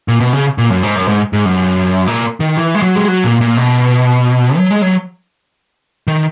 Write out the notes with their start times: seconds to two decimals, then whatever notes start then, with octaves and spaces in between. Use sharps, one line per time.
0.08 A#2
0.20 B2
0.33 C#3
0.58 A#2
0.70 F#2
0.83 G#2
0.96 F#2
1.08 G#2
1.33 G#2
1.45 F#2
2.07 A#2
2.40 D#3
2.57 E3
2.75 G#3
2.82 F#3
2.96 G#3
3.08 F#3
3.24 A#2
3.41 A#2
3.57 B2
4.57 F#3
4.70 G#3
4.82 F#3
6.07 D#3